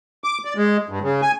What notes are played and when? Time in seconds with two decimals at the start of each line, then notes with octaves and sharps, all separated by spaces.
0.24 D6
0.45 D5
0.56 G#3
0.89 G2
1.02 C#3
1.22 G#5